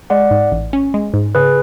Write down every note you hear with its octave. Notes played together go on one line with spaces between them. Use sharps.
G#3 D5 F#5
G#2
A1
C#4
G#3
G#2
C#3 G#4 B4